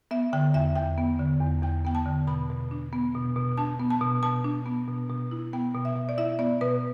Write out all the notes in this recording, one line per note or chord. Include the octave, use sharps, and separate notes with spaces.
B3 E5
D3 G5
E2 E5
E2 G5
B3
D3
E2
E2 G5
B3 G5
A5
D3
B2 B5
B2
D4
B3
B2
B2
D4 A5
B3
A5
B2
B2 A5
D4
B3
B2
B2
E4
B3 G5
B2
E5
B2
D5
E4 E5
B3 D5
B2 B4